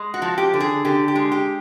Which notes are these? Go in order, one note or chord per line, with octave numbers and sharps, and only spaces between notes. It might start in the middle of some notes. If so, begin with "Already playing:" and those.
Already playing: G#3
F#4
F3
G4
D3
G#4
D3 G4
G4
G#3
G4